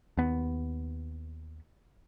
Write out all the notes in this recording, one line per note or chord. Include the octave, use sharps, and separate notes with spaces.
D#2 B3